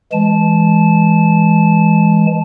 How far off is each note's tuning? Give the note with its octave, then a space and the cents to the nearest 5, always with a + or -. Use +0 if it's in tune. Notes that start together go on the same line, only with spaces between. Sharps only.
E3 +0 G#3 +0 A5 -20